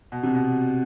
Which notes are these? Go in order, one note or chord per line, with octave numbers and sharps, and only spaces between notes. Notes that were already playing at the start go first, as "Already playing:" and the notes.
B2
C3
B2